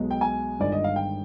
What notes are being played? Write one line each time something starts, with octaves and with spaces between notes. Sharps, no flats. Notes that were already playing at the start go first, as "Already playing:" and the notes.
Already playing: B1 B2 G#3
G5
G#5
G1 G2 D#3 G#3 D5
D#5
F5
G5